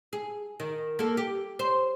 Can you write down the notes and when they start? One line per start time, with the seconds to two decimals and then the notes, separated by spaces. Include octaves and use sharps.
0.13 G#4
0.60 D#3
0.99 A#3 A4
1.17 G4
1.59 C5